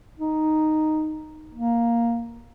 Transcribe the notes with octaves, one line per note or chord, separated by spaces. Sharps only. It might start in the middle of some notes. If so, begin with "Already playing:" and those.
D#4
A#3